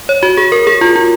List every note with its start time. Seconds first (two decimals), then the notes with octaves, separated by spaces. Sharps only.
0.09 C#5
0.23 F#4
0.37 G#4
0.52 A#4
0.67 G#4
0.81 F4
0.96 F4